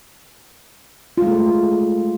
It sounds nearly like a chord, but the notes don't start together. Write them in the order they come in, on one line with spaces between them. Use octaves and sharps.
F4 G#3 A3